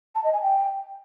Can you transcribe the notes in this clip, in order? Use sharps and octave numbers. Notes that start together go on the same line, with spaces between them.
A5
D#5
G#5
G5